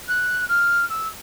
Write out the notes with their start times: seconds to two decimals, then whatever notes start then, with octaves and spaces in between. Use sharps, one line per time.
0.08 F#6
0.48 F6
0.89 E6